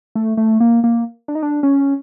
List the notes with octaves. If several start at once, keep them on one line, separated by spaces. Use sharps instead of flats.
A3
A3
A#3
A#3
D4
D#4
D4
C#4